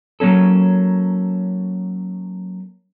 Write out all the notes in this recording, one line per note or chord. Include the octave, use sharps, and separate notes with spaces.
F#3 A#3 C#4 A4